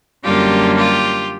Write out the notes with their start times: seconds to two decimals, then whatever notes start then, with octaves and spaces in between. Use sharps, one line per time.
0.25 F#2 D3 G3 A#3 F4 G4
0.77 F4 G4